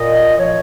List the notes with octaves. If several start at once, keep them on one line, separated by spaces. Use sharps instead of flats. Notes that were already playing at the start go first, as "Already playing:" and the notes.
Already playing: A#2 D#5
F3 C#5